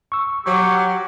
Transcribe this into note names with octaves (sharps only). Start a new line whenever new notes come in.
C#6 E6
F#3 G4 C#6